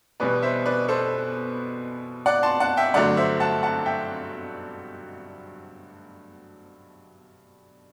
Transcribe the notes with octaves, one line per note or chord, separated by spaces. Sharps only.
E2 B2 G3 B3 B4 D5
C5 E5
B4 D5
A4 C5
D5 F#5
A5 C6
F#5 A5
E5 G5
G2 D3 F#3 A3 D5 F#5
C5 E5
F#5 A5
F#5 A5
E5 G5